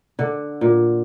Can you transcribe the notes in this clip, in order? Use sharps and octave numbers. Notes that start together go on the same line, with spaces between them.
D3
A#2